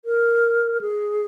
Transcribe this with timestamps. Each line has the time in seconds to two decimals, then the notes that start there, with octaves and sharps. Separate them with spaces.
0.05 A#4
0.81 G#4